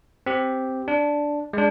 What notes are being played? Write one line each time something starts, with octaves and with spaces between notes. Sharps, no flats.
C4 G4
D4
G#3 D4